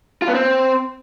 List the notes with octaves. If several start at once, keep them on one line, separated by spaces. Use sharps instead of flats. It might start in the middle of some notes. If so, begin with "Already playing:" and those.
F4
B3
C4